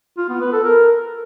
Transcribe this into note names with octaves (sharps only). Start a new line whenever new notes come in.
F4
B3
B4
A4
A#4